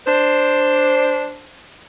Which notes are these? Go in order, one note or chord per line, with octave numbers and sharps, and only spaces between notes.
D4 C5